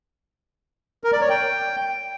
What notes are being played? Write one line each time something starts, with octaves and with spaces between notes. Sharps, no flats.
A#4
D5
C#5
G5